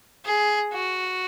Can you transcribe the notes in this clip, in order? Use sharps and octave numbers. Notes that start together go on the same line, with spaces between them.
G#4
F#4